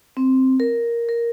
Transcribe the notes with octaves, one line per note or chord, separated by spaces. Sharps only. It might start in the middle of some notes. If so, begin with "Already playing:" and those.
C4
A#4
A#4